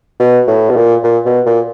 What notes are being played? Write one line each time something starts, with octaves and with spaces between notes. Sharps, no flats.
B2
A2
B2
A#2
A#2
B2
A#2